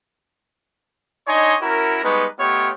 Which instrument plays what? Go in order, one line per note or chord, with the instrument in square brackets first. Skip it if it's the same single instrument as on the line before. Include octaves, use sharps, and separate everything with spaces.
[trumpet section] D4 D#4 C#5 D#5 G#5 C6
C#4 E4 F#4 A#4
G3 G#3 B3 D#4 B4 C#6
A3 B3 F4 G4 C#5 D#5